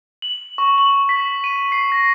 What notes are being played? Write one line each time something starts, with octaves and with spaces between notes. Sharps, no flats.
F#7
C#6
F#7
B6
D#7
C7
A#6